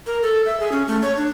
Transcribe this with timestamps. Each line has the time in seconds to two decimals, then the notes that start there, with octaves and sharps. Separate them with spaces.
0.07 A#4
0.22 A4
0.46 E5
0.60 G#4
0.72 C#4
0.88 A3
1.02 C#5
1.17 D4